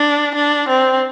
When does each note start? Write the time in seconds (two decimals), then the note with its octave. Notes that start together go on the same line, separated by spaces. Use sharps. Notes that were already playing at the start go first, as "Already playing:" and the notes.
Already playing: D4
0.35 D4
0.68 C4